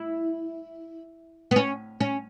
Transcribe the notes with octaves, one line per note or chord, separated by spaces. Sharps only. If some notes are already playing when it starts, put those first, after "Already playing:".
Already playing: E4
B3
C#4
C#4